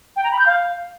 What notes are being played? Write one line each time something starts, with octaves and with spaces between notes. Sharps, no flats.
G5
A#5
B5
G6
F5